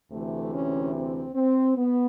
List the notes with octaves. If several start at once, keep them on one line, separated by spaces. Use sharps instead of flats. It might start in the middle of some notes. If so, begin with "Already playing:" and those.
D2 C3 E3 A3
C#4
C4
C4
B3